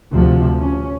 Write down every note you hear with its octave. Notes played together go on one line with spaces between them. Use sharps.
D2 C3 F3
C#4